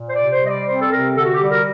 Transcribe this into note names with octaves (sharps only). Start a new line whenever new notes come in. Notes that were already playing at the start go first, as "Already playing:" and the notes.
Already playing: A#2
C5
C3 D5
C5
G3 D#5
D5
C4 C5
A4
C3 A#4
D3 A4
F#4
G4
G3
A#4